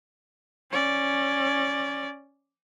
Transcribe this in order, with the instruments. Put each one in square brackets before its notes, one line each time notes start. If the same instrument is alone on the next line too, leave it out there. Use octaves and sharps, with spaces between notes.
[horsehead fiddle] C#4 D5